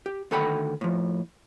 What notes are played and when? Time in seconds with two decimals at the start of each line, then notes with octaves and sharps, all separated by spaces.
0.06 G4
0.31 D2 D#3 A4 F#5 G5 B5
0.81 A2 F3